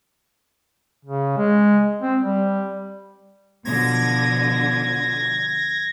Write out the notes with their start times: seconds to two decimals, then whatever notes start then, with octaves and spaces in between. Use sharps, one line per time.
1.05 C#3
1.38 G#3
2.02 C4
2.21 G3
3.65 B2 D3 F3 G#6 A#6